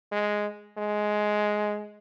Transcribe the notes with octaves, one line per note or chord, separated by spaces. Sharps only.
G#3
G#3